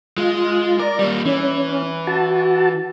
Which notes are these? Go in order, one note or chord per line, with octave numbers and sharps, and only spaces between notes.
G#3 F4
A#4 D5
G3 A#3
E3 C#4
F#4 A5